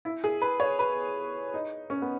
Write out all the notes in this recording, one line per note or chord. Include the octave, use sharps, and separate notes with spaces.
E4
G#4
B4
C#5
B4
D#4
C#4
B3